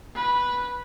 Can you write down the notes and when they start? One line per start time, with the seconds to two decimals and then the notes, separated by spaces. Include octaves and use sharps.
0.15 B4